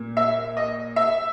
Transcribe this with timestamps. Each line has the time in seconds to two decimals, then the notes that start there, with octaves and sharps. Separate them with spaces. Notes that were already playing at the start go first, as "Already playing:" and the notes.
Already playing: A#2
0.17 E5
0.57 D#5
0.96 E5